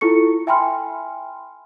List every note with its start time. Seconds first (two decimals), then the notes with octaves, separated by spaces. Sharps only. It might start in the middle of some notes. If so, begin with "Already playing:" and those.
0.01 E4 F4 A4 C#6 C#7
0.47 E5 G5 G#5 B5 C6 F6